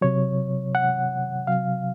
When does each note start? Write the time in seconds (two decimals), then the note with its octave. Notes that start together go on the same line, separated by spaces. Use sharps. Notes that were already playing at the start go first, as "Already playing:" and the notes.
0.01 C3 F#3 C#5
0.75 F#5
1.47 C3 F#3 F5